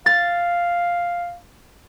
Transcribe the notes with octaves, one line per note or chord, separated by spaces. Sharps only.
F5 A6